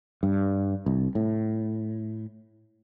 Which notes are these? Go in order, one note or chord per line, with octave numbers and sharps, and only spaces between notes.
G2
C2
A2